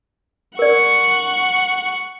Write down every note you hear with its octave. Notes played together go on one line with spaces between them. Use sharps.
A#4 D5 F#5 C#6